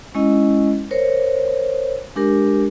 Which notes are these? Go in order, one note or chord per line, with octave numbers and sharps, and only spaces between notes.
G#3 C#4 E4 D#5
A#4 C5 C#5
G#3 D4 G4 A#4